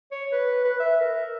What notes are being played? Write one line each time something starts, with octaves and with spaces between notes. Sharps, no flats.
C#5
B4
B4
E5
A#4